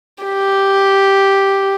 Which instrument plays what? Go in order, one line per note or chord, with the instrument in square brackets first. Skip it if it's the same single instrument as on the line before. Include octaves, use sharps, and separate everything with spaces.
[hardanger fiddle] G4